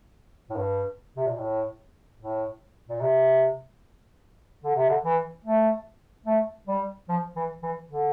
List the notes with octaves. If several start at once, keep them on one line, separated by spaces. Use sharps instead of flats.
A2
G2
C3
A#2
A2
A2
A#2
C3
D3
C3
D3
E3
A3
A3
G3
F3
E3
E3
D3